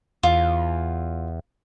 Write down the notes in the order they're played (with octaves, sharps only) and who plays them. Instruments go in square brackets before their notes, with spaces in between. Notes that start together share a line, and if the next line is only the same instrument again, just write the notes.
[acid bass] E2 [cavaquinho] F4